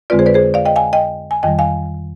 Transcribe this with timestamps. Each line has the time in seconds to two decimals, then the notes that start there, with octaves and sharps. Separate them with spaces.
0.10 F2 D3 G#3 C4 F4 B4 D5
0.19 G#4 C5
0.26 B4 D5
0.34 G#4 C5
0.54 D5 F5
0.66 D#5 G5
0.76 F5 G#5
0.93 D#5 G5
1.31 G#5
1.43 F2 D#3 G3 D#5 G5
1.59 F5 G#5